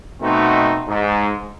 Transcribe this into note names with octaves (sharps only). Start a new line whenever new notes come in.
B2 A3 C4 D#4 F#4
G#2